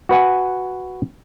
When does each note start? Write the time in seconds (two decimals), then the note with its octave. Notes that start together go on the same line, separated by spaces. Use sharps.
0.09 F#4 B4 F#5 G#5